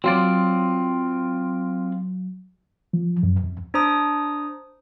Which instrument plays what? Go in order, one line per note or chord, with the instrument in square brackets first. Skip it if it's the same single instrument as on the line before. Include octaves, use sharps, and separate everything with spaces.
[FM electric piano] F#3 [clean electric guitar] C4 F4 D5
[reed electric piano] F3
F#2
F2
[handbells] D4 C5 A#5 D#6